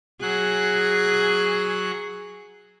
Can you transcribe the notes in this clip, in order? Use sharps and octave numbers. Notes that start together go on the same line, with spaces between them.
F#3 F#4 G#4 F#6